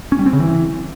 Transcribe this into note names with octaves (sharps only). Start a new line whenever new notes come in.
C#4
G3
C4
C#3
E3